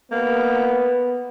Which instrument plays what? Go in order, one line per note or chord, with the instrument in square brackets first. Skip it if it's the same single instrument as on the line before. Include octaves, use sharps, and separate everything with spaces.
[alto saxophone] A#3 [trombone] B3